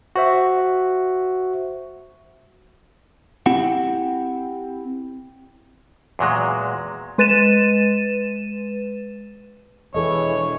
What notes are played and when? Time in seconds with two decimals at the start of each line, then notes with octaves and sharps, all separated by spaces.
0.16 F#4 C5 E5
3.46 C4 E4 G4 F#5
6.19 E2 A#2 F#3 G#3
7.18 G#3 B4 A6 D#7 E7
9.94 E1 E3 G#4 A4 C#5 D#5